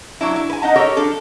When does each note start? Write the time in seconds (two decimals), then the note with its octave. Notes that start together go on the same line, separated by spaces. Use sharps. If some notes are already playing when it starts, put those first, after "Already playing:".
0.21 F#3 D4 E4
0.36 E4
0.50 B4 G#5
0.62 D#4 D#5 F#5 A5
0.76 G4 A4 A#4 C#5 D#5
0.97 F3 D4 A4